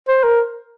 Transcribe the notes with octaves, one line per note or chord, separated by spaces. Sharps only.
C5
A#4